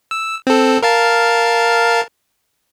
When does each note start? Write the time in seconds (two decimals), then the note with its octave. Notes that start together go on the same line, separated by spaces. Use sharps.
0.11 E6
0.47 C4 A4
0.83 A#4 F5 A5